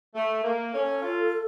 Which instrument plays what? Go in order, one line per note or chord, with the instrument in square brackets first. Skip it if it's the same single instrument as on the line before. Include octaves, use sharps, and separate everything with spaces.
[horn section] A3
A#3
[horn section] C#4 [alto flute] A4
[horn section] F4